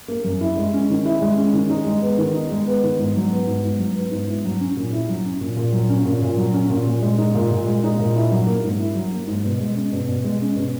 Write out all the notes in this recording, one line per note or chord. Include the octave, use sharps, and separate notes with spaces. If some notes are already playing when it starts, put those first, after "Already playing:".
A#3
F#2
E4
G#3
C#4
D#3
E4
G#3
C#4
D#3
D#4
G#3
B3
D#3
D#4
G#3
B3
D#3
G#2
F#3
B3
G#2
G#2
F#3
B3
G#2
E4
F#3
C#4
A#2
E4
F#3
C#4
A#2
A#2
F#3
C#4
A#2
A#2
F#3
C#4
A#2
A#2
G#3
D#4
A#2
A#2
G#3
D#4
A#2
E4
F#3
A#3
G#2
E4
F#3
A#3
G#2
B2
G#3
C#4
B2
B2
G#3
C#4
B2